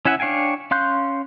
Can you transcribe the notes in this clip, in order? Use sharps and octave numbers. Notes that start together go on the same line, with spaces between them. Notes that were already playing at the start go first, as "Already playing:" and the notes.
C#4 E4 E5 F#5 G#5
D4 C#5 F5 G5 G#5
C#4 F5 C6 F#6 G6